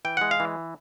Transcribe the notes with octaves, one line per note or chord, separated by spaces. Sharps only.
E3 G5
G#3 F#5
F5
E3